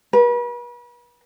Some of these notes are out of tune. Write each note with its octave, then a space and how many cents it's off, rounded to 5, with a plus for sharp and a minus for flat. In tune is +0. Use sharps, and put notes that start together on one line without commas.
B4 -40